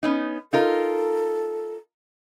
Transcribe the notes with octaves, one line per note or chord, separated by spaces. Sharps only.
B3 C#4 D#4
D#4 F4 A4 A#4